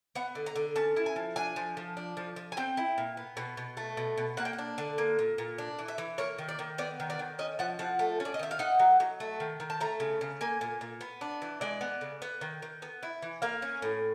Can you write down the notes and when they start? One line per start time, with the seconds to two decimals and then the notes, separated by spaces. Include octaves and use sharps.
0.15 B3 F#5
0.35 D3
0.46 A#5
0.56 D3
0.76 C#4 A5
0.96 E4
1.06 G#5
1.16 F3
1.36 D4 G#5
1.56 F3
1.77 F3
1.97 D4
2.17 F3
2.36 F3
2.52 G#5
2.57 C4 G5
2.77 E4
2.98 A#2
3.17 B3
3.37 B2
3.57 B2
3.77 A3
3.97 B2
4.17 B2
4.37 A#3 F#5
4.45 G5
4.53 F#5
4.58 D4
4.78 D3
4.98 A#3
5.19 A#2
5.38 A#2
5.58 D4
5.79 E3
5.88 E5
5.98 E3
6.18 A#3 C#5
6.39 D#3
6.49 D5
6.59 D#3
6.78 B3 D5
7.00 D#3
7.10 D5
7.19 D#3
7.39 C#4 D#5
7.59 F3 F#5
7.79 F3 F#5
7.99 A3
8.20 C#4
8.25 D5
8.34 D#5
8.39 D#3 E5
8.51 F5
8.59 D#4 F#5
8.79 F#3
9.00 F#3
9.20 A3
9.40 D#3
9.60 D#3
9.70 A5
9.80 A3 A#5
10.00 C#3
10.21 C#3
10.41 A#3 G#5
10.61 A#2
10.81 A#2
11.01 B3
11.21 D4
11.42 E3
11.61 G#3 D5
11.81 B3
12.01 C#3
12.22 B3
12.41 D#3
12.62 D#3
12.82 B3
13.03 E4
13.22 E3
13.42 A#3 F5
13.62 C#4
13.82 A2